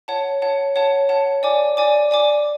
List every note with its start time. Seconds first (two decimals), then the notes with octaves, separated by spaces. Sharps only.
0.08 C#5 F#5 A5
0.42 C#5 F#5 A5
0.76 C#5 F#5 A5
1.09 C#5 F#5 A5
1.43 D5 G#5 D6
1.77 D5 G#5 D6
2.11 D5 G#5 D6